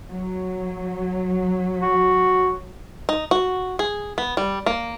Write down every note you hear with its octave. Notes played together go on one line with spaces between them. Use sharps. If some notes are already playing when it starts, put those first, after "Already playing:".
F#3
F#4
D#4
F#4
G#4
B3
G3
A#3